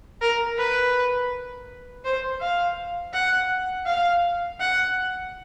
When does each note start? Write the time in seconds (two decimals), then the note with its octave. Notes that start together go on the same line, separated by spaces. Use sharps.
0.21 A#4
0.57 B4
2.04 C5
2.40 F5
3.13 F#5
3.86 F5
4.60 F#5